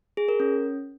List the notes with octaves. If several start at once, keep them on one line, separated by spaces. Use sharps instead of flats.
G#4
A#4
C#4